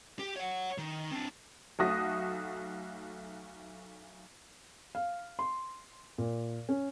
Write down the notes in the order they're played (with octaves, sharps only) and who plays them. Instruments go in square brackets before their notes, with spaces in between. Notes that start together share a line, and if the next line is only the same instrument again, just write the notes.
[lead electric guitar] G4
C#5 F#5
D#3
C4 D4
[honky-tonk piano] B1 A3 F#4 D#6 A#6
[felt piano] F5
C6
A#2
C#4